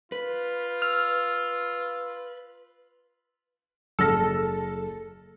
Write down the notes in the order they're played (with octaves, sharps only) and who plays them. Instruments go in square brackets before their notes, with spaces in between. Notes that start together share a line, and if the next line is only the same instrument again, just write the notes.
[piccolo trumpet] F4 [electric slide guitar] B4
[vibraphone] E6 [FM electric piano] F6
[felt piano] F#1 F6 A#6 [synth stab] A4